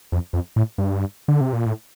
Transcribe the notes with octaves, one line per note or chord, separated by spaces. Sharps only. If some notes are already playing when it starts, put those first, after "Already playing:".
F2
F2
A2
G2
D3
C3
A#2
A2